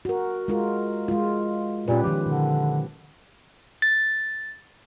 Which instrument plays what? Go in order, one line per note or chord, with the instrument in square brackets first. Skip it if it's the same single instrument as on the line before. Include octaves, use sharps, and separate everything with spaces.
[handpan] F#4 A#4
G#3 F4 A#4
G#3 F4
[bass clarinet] A#2 [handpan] C#4 G4 B4
[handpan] D#3 F3 [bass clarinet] G4
[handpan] A#2 [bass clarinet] D3
[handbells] A6